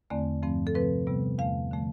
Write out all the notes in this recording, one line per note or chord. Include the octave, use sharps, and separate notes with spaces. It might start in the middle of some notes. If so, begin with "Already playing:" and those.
E2 D3 A3 C4 D5
G2 F3 A3 C4
A4
C3 F3 A3 C4 B4
C3 G3 B3
E2 D3 A3 F5
D3 F3 A3